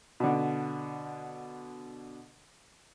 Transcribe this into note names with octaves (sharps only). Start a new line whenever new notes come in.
B2 D3